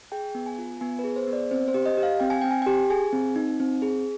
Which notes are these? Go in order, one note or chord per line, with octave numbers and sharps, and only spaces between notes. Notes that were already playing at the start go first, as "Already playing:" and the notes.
G#4 G5
B3
G#5
F4
B3 G#5
B4
G#4
C5
B3
D5
C4 C5
C5
G4
D#5
G4
F5
C4 G5
G#5
C4 G5
G#5
G5
G4
G#4 G#5
C4
D#4
C4
G#4